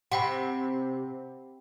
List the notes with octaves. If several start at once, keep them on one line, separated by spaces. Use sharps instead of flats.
C3 F#5 G5 B5